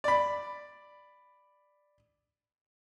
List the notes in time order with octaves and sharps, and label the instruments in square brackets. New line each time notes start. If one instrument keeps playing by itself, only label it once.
[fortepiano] D5 B5